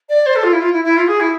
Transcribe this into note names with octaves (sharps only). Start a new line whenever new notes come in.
D5
C5
A4
F4
E4
F4
E4
E4
F4
G#4
E4